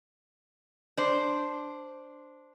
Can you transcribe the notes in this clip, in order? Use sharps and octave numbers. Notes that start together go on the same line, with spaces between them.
D4 C5